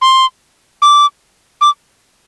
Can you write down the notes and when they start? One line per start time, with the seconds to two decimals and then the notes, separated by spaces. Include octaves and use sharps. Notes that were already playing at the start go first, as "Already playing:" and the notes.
0.02 C6
0.82 D6
1.61 D6